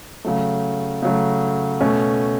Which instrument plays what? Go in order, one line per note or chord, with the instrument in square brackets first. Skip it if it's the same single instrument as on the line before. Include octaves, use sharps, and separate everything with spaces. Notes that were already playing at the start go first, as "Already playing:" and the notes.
[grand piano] C#3 F#3 A3
C#3 F#3 A3
B2 A3 C#4